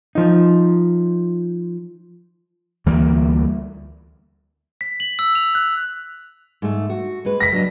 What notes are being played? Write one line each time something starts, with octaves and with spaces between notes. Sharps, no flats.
F3 D#4
D2 E3 G3 A#3
B6
F#7
E6
F7
F#6
G#2 A3
F#4
G#3 B4
A#6 B6
F#3 D4 D#5